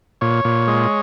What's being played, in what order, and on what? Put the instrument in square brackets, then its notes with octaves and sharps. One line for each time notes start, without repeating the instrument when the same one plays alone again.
[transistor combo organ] A#2 C#5
A#2
G#3